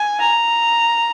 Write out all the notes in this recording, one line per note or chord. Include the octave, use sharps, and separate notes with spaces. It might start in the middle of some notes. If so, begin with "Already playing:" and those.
Already playing: G#5
A#5